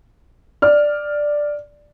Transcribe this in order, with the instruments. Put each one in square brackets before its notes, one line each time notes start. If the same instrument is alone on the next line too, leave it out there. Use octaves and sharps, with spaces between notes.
[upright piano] D5 F6